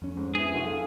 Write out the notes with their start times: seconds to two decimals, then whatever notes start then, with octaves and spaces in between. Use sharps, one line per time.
0.02 F2 C#4
0.17 G#2
0.35 B3 D4 E4 G#4
0.52 B1 F#4
0.63 A4 F5